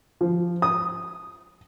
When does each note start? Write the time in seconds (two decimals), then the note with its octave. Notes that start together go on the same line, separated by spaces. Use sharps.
0.21 F3
0.62 D#6